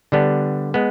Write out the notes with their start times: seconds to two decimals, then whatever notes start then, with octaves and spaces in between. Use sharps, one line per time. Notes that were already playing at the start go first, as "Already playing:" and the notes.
0.12 D3 G3 B3 D4
0.74 G#3 B3